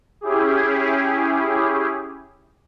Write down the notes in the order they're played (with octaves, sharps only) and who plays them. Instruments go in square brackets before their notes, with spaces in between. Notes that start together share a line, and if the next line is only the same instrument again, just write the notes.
[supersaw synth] C#4 E4 G4 G#4